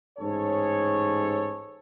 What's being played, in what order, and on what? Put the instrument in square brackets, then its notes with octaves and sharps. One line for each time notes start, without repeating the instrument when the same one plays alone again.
[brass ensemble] A1 G#2 G#4 A4 C#5